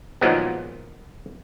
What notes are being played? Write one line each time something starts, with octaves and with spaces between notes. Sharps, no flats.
A#2 D#3 F3 F#3 G#3 B3